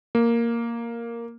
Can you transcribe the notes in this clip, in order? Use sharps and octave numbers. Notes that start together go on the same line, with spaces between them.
A#3